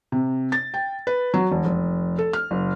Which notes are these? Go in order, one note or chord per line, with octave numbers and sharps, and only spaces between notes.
C3
A6
G5
B4
F#3
E1
F1
A4
F6
F#1